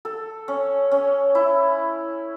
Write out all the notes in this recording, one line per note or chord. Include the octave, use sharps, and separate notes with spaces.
A4
C#4
C#4
E4